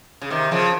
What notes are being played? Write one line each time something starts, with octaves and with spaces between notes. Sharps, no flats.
C#3
C3 D#3
C#3 F3